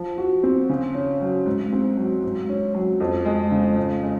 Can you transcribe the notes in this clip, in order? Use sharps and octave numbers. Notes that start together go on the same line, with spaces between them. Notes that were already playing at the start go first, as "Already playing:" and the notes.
Already playing: F3
F#4
C4
C#3
C#4
F#3
G#2
C4
F#3
G#2
C#4
F#3
F2
G#3
C#3
G#2
G#3